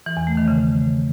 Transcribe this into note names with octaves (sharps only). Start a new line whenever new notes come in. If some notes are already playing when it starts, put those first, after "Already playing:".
E3
E2
A3
D#3
C#3